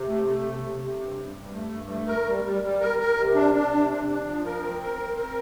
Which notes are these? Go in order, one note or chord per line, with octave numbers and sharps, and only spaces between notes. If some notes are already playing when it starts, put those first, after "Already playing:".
Already playing: C3
A3
A3
C3
C3
C3
G2
G2
G2
A3
G2
A3
A#4
G3
G3
G3
A#4
A#4
C3
D4
D4
C3
D4
D4
F3
A#4
C4
A#4
C4
A#4